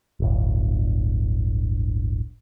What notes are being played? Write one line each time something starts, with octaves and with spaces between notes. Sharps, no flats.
D1 G1